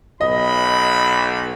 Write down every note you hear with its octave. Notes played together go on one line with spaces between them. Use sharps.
B1 D#5 B5